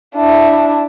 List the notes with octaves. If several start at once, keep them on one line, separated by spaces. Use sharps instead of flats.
D4 E4